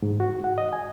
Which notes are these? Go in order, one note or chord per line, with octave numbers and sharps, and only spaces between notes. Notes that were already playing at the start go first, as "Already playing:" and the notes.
G#2
F#4
F#5
D#5
G#5